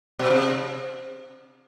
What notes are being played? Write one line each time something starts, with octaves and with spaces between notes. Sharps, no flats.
B2
C3